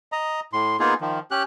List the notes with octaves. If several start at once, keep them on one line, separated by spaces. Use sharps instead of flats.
D#5 A#5
A2 C6
A#3 B3 D#4 F4 G#4
D#3 F3
C#4 G4 F#6